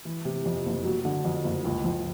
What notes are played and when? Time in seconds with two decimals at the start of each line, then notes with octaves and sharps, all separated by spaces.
0.05 E3
0.25 C3
0.46 F2
0.66 F#1
0.85 F#3
1.05 D3
1.25 F2
1.44 F#1
1.65 C#2
1.84 F3